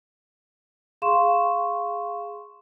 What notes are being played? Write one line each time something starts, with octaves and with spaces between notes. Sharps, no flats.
G#4 F5 C6 C#6 E7